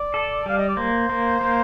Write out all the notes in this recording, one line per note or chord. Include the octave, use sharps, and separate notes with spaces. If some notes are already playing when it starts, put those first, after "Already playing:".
Already playing: D5
A4
G3 F5
D#5
D5
A#3 C5
A#3
A#3